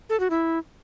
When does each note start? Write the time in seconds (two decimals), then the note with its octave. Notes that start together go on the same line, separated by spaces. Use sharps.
0.09 A4
0.20 F#4
0.30 E4